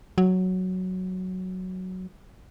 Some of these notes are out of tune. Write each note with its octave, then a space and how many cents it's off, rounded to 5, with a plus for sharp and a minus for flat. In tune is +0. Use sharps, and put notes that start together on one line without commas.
F#3 +0